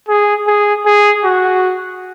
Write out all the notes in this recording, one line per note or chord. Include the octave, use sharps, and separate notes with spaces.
G#4
G#4
G#4
F#4